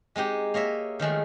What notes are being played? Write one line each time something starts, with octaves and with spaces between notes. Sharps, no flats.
G#3 C4 D#4 G4
A#3 C#5 D#5 E5
D#3 F3 G#3 A3